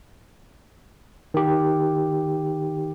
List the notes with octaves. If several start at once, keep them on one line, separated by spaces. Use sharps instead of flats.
D#3 G4